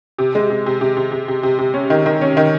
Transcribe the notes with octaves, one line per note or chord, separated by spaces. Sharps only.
C3
G#3
C3
C3
C3
C3
C3
C3
C3
C3
C#4
D#3
D#3
C#4
D#3